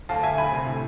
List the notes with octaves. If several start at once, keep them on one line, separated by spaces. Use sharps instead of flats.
D2 F5 A5
D2 E5 G#5
D2 G#5 B5
C3
A2